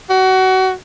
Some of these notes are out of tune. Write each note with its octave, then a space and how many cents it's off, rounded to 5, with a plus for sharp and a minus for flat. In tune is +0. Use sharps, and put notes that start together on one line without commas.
F#4 +25